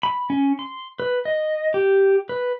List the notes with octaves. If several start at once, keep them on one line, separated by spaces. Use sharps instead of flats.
B5
C#4
C6
B4
D#5
G4
B4